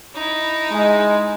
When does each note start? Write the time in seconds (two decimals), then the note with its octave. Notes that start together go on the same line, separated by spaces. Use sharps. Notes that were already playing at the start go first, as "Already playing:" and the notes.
0.15 D#4 E4
0.71 G#3